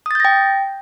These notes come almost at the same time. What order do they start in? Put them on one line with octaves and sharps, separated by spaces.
D#6 A6 G6 A#6 G5